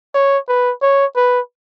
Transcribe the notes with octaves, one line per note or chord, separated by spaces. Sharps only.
C#5
B4
C#5
B4